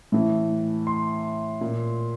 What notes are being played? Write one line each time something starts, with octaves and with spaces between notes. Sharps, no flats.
A2 E3
C6
A#2